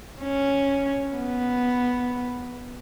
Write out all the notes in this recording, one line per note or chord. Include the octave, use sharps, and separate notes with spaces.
C#4
B3